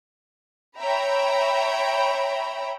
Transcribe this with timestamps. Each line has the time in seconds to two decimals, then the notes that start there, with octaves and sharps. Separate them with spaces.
0.78 C#5 E5 G5 A#5 B5